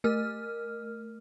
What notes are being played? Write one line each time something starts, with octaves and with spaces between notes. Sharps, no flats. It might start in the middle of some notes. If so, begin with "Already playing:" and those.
A3 A#4 F6